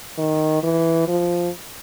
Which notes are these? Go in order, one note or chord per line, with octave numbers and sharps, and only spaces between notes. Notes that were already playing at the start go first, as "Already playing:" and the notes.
D#3
E3
F3